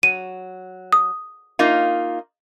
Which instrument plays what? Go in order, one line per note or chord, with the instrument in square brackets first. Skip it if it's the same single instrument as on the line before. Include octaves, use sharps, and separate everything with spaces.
[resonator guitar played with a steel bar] F#3 [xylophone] D#7
[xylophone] D#6
[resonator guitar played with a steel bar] A#3 D#4 F4